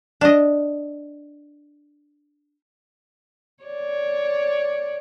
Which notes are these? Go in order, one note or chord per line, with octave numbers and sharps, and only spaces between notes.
D4 D#5
C#5 D5